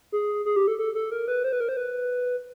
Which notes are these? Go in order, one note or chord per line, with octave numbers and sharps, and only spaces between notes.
G#4
G#4
G4
A4
A4
A4
A#4
B4
C5
B4
A#4
C5
B4